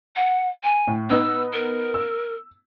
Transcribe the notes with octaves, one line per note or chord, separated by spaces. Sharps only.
F#5
G#5
A2
B3 D#4 B4 E6
A#4
E6